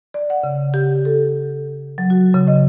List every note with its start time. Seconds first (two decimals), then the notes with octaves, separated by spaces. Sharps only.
0.14 D5
0.30 F#5
0.44 C#3
0.74 G4
1.05 A4
1.98 F#3
2.10 F#4
2.34 C#3
2.47 D#5